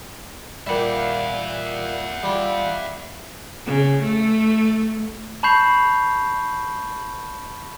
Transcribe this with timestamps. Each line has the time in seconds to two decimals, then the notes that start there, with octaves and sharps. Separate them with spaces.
0.67 A#2 G3 E5 F#5
2.23 G3 F4
3.66 C#3
4.03 A3
5.43 A5 B5 C#6 G6 C7 F7